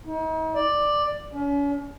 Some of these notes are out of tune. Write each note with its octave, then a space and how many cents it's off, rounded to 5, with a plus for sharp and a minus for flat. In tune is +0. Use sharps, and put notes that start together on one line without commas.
D#4 +40
D5 +10
C#4 +40